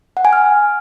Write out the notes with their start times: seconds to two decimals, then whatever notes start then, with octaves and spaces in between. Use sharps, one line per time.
0.17 F#5
0.25 G#5
0.33 F6